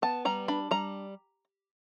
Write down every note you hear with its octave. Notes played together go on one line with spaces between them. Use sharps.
B3 A5
G3 A#5
D4 B5
G3 A#5